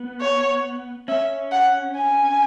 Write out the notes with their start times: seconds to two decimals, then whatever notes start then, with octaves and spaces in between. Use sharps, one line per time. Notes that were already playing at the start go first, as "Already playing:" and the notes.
Already playing: B3
0.21 C#5
1.08 C#4 E5
1.52 F#5
1.96 G#5